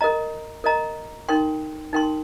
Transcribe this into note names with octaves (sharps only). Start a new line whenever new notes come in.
A#4 D#5 A#5
A#4 D#5 A#5
D#4 A#4 G5 C6
D#4 A#4 G5 C6